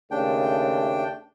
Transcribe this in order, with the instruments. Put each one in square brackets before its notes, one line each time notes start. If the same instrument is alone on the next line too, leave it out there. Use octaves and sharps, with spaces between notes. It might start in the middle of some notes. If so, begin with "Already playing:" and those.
[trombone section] D#2 C#3 A3 [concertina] D4 G5